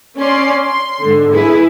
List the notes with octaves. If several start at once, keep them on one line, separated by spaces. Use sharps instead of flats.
C#4 D5 C6
C6
G#2 D3
E4 G#4 B4